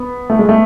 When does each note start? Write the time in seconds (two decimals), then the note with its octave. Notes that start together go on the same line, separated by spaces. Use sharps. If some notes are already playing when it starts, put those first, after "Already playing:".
Already playing: B3
0.30 A3
0.39 G#3
0.49 A3